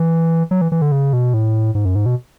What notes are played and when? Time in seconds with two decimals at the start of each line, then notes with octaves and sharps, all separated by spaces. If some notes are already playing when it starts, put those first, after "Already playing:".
Already playing: E3
0.51 F#3
0.61 E3
0.72 E3
0.82 D3
0.92 C#3
1.13 B2
1.34 A2
1.75 G#2
1.85 F#2
1.95 G#2
2.06 B2